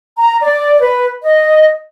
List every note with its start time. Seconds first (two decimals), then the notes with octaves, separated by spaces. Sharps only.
0.18 A#5
0.42 D5
0.80 B4
1.22 D#5